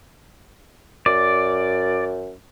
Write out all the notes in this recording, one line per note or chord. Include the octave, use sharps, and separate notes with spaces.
F#2 D5